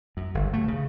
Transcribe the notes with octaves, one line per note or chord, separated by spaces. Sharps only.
F#2
G1
A3
C#3